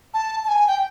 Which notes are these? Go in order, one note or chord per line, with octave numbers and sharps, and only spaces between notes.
A5
A5
G#5
G5